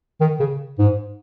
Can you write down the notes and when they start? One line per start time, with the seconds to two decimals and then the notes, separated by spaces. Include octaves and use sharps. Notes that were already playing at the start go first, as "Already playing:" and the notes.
0.20 D#3
0.40 C#3
0.78 G#2